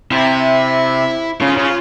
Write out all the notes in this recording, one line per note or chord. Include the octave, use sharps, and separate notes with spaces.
C3 E4
C#3 F4
C#3 F4